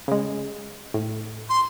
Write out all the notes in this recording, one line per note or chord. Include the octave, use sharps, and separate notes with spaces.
C#3 G#3
A2
C6